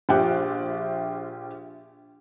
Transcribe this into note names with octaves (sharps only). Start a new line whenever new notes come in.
A#1 F4 G4 E5 G5 F#6